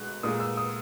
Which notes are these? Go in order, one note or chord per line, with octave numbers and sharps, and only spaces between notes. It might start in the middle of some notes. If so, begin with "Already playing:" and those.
Already playing: B2 G#3 F#6
A#2 G#3 D#6
E6
D#6